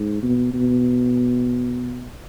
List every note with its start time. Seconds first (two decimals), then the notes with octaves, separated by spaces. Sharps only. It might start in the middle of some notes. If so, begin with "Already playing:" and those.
Already playing: G#2
0.23 B2
0.54 B2